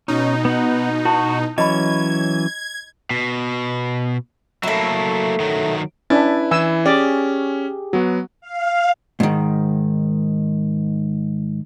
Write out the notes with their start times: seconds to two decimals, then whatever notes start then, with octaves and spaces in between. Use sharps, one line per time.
0.08 B2 C#4 D#4
0.45 B3 F#5
1.05 E4 F#4
1.58 E3 F#3 C#4 D#5 B5 G#6
3.11 B2
4.63 F#3 A3 A#3 E4
5.40 D#3 F#3
6.10 C#4 D4 E4 B4 A6
6.51 E3 E4 G#5 E6
6.86 C#4 G4 G#4 D5
7.93 F#3 B3 F#4
8.41 F5
9.20 G#2 D#3